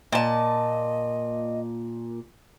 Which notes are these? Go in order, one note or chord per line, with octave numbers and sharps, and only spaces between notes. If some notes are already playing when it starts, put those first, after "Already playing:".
A#2 D#5 A5